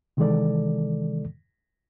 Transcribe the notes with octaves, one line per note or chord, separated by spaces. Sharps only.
C3 D#3 E3 G#3 A4 D5